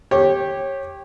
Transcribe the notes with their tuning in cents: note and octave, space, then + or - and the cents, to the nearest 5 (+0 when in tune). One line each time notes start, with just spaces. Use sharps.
G4 +0 C#5 -20